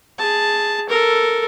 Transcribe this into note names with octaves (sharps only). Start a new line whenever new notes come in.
G#4 A5
A4 A#4